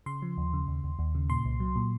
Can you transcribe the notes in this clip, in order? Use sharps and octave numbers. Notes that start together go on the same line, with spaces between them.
C#3 C6
F3
D#2
C#3
D#2
D#2
D#2
C#3
A#2 C6
C2
F#3
A#2